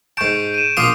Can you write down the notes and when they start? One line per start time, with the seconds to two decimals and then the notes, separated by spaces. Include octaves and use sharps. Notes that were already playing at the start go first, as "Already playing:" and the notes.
0.17 G#2 A5 C#6 G6 D7
0.54 D#7 E7
0.77 A#1 F4 C6 D6 D#6 D#7